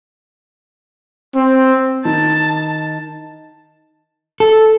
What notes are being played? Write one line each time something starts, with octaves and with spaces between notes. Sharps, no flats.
C4
D#3 A5
A4